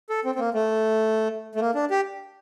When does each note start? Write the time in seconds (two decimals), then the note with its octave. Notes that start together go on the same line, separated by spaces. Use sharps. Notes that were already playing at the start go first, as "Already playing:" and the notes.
0.10 A4
0.25 C4
0.35 C4
0.39 A#3
0.54 A3
1.55 A3
1.60 A#3
1.75 D4
1.90 G4